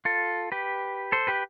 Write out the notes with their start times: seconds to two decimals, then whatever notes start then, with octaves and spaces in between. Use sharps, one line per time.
0.05 F4 A4
0.52 G4 B4
1.12 A4 C5
1.27 G4 B4